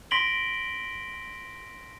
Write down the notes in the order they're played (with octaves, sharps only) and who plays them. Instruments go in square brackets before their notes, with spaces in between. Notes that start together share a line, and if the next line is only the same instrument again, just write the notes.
[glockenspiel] C6 A#6 B6 D7 F#7 G7